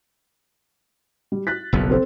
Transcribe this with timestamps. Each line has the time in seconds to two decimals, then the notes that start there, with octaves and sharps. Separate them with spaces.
1.32 G3
1.47 F#6 A6 B6
1.73 F#1 B1 F2
1.90 C4 A4 C5